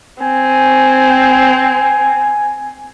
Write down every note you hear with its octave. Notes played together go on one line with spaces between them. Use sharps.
C4 G#5